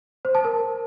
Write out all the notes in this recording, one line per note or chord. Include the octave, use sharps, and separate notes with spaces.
C5
A5
A#4